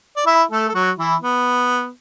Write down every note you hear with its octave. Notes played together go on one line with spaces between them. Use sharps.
D5
E4 E5
A3 A4
A4
F#3 F#4
E3 E4
B3